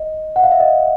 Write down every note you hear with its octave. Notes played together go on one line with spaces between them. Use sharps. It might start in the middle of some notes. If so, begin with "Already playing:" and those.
Already playing: D#5
F#5
F5
E5
D#5